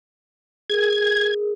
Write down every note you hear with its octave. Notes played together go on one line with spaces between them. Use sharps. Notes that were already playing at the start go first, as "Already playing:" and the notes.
G#4 A#4 G#6